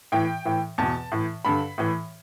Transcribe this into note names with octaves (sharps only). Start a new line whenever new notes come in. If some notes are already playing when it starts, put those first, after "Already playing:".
A2 E3 G5
A2 E3
E2 B2 A5
A2 E3
G2 D3 B5
A2 E3